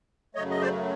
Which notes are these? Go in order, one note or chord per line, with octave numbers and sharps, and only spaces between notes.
F#2 C#3 F#3 A3 C#5 D#5
D#5
C5 D5